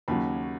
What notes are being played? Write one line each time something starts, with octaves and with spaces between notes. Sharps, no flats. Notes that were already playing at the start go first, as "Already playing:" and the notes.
D#2 C#3 F#3 B5